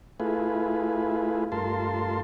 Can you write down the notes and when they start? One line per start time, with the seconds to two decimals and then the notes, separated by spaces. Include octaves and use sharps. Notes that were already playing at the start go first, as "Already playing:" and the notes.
0.20 A3 E4 F4 G#4 B4
1.52 G2 A3 F4 A#4 A5 C6